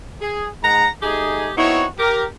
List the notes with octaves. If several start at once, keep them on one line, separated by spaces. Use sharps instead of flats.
G#4
G#2 G#3 F#5 A#5
A3 D#4 G4 G#4
B3 C4 D#4 E4 F#4 C#5
G4 A#4